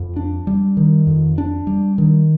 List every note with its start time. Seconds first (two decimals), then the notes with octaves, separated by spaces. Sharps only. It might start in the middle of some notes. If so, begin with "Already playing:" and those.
Already playing: F2
0.16 D4
0.47 G3
0.77 D#3
1.07 F2
1.38 D4
1.67 G3
1.98 D#3